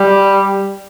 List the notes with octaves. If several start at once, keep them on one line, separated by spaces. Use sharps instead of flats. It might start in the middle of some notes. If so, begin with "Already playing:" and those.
Already playing: G3